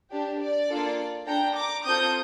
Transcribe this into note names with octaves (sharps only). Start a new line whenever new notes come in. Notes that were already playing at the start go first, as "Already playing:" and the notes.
D4 G4
D5
A#3 D4 F4 A4
D4 A4 G5 A#5
A#5 D6
C4 F4 A4 D#6 G6